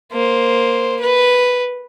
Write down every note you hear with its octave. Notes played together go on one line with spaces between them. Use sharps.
A#3 C5
B4